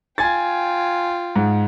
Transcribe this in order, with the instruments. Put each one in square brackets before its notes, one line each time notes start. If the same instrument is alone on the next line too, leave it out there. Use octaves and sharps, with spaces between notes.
[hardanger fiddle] F4 G5 [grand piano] G#5 G#6 A6
[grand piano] G#2